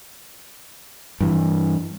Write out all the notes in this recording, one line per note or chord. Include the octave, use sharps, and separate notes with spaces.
G2 E3